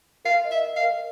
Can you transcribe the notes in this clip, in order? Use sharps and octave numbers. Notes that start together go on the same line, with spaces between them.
A#4 F5
D#5
E5
D#5
F5
A#4